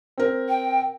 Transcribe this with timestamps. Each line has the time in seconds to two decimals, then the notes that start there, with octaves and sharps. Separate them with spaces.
0.18 C4 A#4
0.49 G5